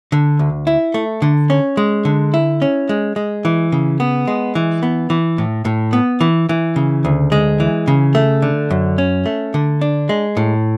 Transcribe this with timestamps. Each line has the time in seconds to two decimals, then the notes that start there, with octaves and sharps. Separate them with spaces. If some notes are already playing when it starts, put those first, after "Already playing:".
0.12 D3
0.39 D2
0.67 E4
0.94 A3
1.22 D3
1.50 C#4
1.77 G#3
2.05 D3
2.34 E4
2.62 C#4
2.89 G#3
3.16 G#3
3.45 E3
3.72 C#3
4.00 B3
4.27 G#3
4.55 E3
4.83 B3
5.10 E3
5.38 A2
5.65 A2
5.93 B3
6.21 E3
6.49 E3
6.76 C#3
7.05 D2
7.32 G#3
7.60 E3
7.88 C#3
8.15 A3
8.42 D3
8.71 F#2
8.98 C#4
9.26 A3
9.54 D3
9.81 D4
10.09 G#3
10.37 A2